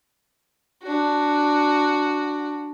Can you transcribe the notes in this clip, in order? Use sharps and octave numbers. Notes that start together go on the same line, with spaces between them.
D4 F#4